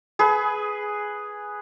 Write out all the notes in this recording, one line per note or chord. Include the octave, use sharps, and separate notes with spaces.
G#4 B4